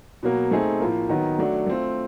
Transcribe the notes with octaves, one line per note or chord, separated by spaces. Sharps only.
B2 F#3 A#3
A3 C4 D#4 G#4
A2 F3 A#3
D#3 F#3 B3 D#4
F#3 A3 D4 F#4
A3 C4 F4